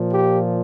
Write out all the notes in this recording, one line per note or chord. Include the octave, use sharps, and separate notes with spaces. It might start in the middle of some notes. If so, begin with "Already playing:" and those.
Already playing: A#2 F3
G4